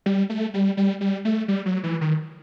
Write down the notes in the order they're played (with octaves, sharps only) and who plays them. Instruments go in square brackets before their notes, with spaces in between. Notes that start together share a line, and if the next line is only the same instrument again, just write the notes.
[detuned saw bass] G3
A3
G3
G3
G3
A3
G3
F#3
E3
D#3